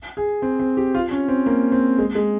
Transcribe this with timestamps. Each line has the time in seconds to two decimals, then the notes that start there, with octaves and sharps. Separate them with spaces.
0.17 G#4
0.42 C4
0.60 C4
0.77 G4
0.95 F4
1.11 C#4
1.28 C4
1.46 A#3
1.72 C4
1.98 G#3
2.15 G#3